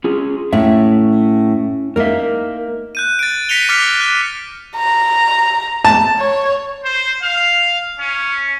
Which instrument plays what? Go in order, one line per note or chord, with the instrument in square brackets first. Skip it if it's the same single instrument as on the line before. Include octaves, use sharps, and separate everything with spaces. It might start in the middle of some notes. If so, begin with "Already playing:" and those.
[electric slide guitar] C#4 F4 G#4
[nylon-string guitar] A2 [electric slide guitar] C#4 E5
[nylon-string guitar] A#3 D#4 [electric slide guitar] A#4 E5
[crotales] F#6 G6 D#7
A6 D7
A#6 B6 C#7 D#7 F7 G7
D6 F6 A6 B6 C#7
F#6
[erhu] A#5
[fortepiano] A5
[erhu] C#5
[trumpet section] C5
F5
C#4